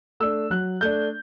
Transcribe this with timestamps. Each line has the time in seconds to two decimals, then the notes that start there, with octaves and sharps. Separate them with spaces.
0.20 A3 D4 E6
0.50 F#3 F#6
0.81 A3 D4 G6